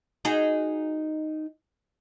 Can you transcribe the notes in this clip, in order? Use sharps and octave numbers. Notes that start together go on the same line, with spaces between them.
D#4 F#4 G#4